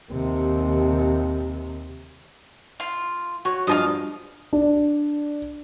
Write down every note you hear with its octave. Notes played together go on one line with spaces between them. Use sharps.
D#2 C3
F4
F#4 C#5
G2 F3 D#5 F5 A5 D#6
D4